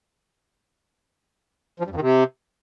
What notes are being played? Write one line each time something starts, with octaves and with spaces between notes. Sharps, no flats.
F3
G2
F2
D#3
C3